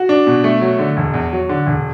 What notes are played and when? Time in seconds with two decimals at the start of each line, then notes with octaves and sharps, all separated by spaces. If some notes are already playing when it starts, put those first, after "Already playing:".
Already playing: F#4
0.09 D4
0.27 B2
0.44 A3
0.61 F#3
0.79 D3
0.97 E1
1.14 E2
1.33 F#3
1.49 D3
1.67 E1